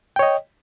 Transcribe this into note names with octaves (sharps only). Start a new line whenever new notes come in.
C#5 D#5 G5